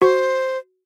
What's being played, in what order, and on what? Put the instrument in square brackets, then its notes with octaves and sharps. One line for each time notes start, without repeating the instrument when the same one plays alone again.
[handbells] F#4 C#6 [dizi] C5